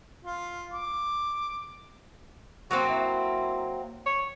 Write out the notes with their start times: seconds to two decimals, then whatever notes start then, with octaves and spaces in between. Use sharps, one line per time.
0.25 F4
0.73 D6
2.71 F#3 A#3 C4 F#4
2.89 E4
4.06 C#5